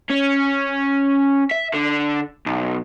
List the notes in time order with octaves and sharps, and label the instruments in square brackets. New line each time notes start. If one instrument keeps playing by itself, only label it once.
[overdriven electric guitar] C#4
E5
D3
B1